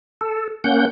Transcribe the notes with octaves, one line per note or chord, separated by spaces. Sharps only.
A4
A#3 C#4 F#5 G6